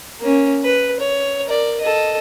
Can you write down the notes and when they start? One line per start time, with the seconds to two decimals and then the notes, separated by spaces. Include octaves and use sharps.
0.20 A#3 C#4
0.64 B4
1.00 C#5
1.46 A#4 D5
1.81 A4 D#5